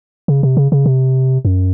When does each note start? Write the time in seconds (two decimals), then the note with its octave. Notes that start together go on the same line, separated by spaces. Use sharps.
0.28 C#3
0.43 C3
0.57 C#3
0.72 C#3
0.86 C3
1.45 F#2